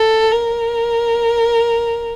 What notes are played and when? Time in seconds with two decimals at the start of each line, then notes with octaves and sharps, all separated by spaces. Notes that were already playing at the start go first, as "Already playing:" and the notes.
Already playing: A4
0.32 A#4